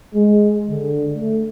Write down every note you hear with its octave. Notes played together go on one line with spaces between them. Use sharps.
G#3
D3
A3